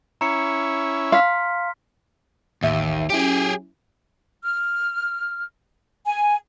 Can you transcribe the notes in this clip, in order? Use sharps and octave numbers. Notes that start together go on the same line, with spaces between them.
C#4 E4 A#5 C#7
F5 C6 F6 B6
A1 D#2 E5 D#7
F#3 C#4 E4 G4 G#4
F6
G#5